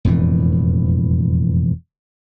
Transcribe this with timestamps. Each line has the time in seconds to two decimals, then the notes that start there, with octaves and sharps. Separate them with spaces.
0.05 E1 F2 A2 E3